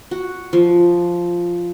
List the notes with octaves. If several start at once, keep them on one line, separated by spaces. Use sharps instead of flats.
F#4
F3